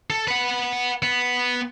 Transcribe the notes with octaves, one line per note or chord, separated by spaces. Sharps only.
A4
B4 F#5
B3